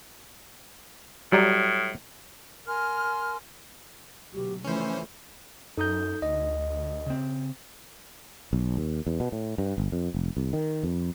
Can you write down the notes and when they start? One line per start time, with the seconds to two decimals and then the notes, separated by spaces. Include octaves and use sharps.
1.32 A2 F#3 G3 A#5
2.67 A#4 G#5 C6 F6
4.34 D2 B2 F#3 G4
4.64 C#3 E3 F3 A3 C#4 C5
5.77 F#2 D#4 A4 A#5 D#6 G6
6.22 D2 D#5
7.06 C#3 C4
8.53 B1
8.77 D#2
9.07 E2
9.20 B2
9.32 A2
9.58 G2
9.78 G1
9.92 F2
10.14 F1
10.37 C2
10.53 D#3
10.83 F2